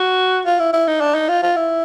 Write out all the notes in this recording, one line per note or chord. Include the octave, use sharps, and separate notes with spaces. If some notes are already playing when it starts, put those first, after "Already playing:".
Already playing: F#4
F4
E4
E4
D#4
D4
D#4
F4
F4
E4